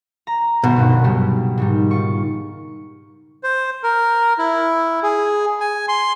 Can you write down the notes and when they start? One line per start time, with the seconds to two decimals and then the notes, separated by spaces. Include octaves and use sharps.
0.27 A#5
0.64 G1 B2 D#3 C4
0.76 C2 G2
1.04 C#3 F#3 G3
1.58 G#2 D#3 G3
1.91 F4 C#6
3.43 C5
3.83 A#4
4.38 E4
5.03 G#4
5.60 G#5
5.88 C6